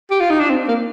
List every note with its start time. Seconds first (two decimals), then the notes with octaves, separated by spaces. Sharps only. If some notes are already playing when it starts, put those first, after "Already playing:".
0.10 G4
0.20 F4
0.30 D#4
0.40 D4
0.50 C4
0.68 A#3